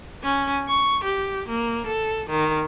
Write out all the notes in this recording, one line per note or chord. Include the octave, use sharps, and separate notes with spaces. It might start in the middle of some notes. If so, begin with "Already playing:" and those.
C#4
C#6
G4
A#3
A4
D#3